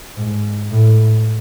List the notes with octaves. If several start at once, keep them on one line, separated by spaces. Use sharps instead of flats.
G#2
A2